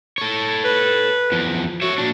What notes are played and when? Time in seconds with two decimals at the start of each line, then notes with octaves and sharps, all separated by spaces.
0.18 A4 C#5
0.64 B4
1.32 E2 F3
1.82 F#4 C#5 E5
1.98 A#2 D4